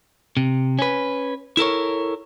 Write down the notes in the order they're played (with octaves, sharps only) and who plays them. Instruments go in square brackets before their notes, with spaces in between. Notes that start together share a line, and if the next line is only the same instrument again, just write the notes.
[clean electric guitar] C3
C#4 B4
E4 A4 A#4 C#5